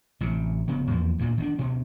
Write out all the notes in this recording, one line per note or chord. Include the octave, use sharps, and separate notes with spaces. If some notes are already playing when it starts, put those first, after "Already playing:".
A1 C3
F1 C#3 B3
E2 F3 A#3
D2 A#2
D#3 C4 D4
D2 B2 C#4